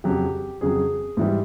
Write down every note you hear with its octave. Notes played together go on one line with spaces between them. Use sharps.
F2 C#3 F#3 G4
F2 C#3 F#3 G#4
G#2 E3 G3